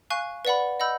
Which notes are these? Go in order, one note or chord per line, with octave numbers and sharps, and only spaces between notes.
F5 G#5 C#6 F#6
B4 D5 F#5 B5
D#5 F#5 B5 E6 G6